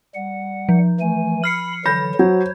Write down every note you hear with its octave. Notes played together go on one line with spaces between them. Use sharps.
G3 F#5
F3
E3 A3 G#5
B5 F6 C7 C#7
D3 E3 F#3 B5 G6 A#6
F#3 C5 C#5